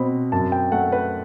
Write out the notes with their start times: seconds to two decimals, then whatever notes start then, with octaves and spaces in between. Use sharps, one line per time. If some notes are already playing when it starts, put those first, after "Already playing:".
Already playing: B2 C4 B5
0.32 F#2 A5
0.52 G5
0.72 A3 F#5
0.92 B4